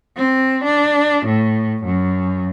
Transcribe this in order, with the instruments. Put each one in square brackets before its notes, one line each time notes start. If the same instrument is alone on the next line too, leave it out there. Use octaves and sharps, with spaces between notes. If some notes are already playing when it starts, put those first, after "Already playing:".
[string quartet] C4
D4
A2
F#2